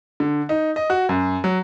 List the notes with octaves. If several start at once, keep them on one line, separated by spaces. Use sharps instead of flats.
D3
D#4
D#5
F#4
F#2
F#3